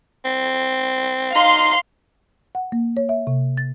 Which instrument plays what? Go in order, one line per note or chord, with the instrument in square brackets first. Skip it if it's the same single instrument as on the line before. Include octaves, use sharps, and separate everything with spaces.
[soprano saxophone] C4
[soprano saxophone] D#4 [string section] F5 C6
[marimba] F#5
A#3
C#5
E5
C3
A6